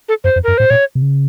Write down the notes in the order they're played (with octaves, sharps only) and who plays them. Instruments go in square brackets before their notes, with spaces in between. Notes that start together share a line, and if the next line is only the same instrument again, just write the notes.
[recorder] A4
[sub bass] F#2 [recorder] C5
[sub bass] F2
[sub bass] F#2 [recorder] A#4
[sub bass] A2 [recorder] C5
[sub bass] A#2 [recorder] C#5
[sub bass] C3
C#3